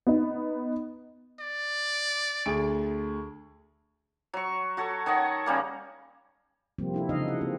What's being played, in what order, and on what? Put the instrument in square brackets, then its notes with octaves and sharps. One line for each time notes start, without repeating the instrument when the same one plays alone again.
[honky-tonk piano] B3 D#4
[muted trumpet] D5
[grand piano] D2 G#4 D7
[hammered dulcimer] F#3 C#6
F#4 A4 C#5
D#3 C#5 D#5 F#5
C#3 G3 A#3
[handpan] C3 F3 G3 A#3 C4
D4 E4 A4
C#3 E3 D#4 F4 D#5 F5
F#5
A#3 C4